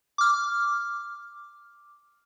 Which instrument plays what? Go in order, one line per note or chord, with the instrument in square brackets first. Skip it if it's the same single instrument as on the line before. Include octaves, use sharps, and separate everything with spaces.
[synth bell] D6 F6